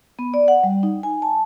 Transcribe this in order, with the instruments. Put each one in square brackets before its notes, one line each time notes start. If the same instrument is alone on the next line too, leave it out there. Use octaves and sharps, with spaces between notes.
[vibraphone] B3
D5
F#5
G3
D#4
G#5
A5